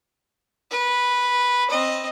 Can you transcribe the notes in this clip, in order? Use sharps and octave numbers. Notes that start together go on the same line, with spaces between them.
B4
C4 D#5